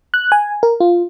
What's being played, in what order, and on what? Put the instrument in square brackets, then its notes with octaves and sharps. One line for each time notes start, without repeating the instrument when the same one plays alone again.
[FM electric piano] F#6
G#5
A#4
F4